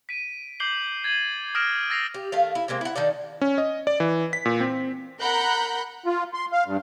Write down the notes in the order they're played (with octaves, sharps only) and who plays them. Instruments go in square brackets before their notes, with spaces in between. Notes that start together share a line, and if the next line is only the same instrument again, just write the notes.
[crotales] B6 D7 D#7
D6 G6 C7 F#7 G7
F#7
G#6 A6 D#7 F#7
D#6 F6 A6 A#6 D7 E7
E6 A6 A#6 C7 F7
[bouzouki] G4
D#3 A3 F5
E4
C3 G#3 A#3 C4
E4 F#5
D#3 D#4 A4 D5
[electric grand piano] C#4
D#5
D5
E3
B6
A#2
C4
[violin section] A#4 F#5 A#5 B5 F#6 G6
[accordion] F4
C6
F5
G2